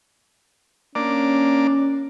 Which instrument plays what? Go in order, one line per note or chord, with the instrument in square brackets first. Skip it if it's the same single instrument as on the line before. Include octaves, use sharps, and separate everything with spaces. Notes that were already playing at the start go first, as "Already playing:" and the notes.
[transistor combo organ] A#3 D4 D5 [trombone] C#4